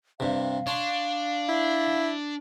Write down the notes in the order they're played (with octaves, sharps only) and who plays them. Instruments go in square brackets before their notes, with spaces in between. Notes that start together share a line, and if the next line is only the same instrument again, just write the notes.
[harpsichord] G2 C3 [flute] F5
[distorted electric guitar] D4 [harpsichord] C#5 C6
[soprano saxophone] E4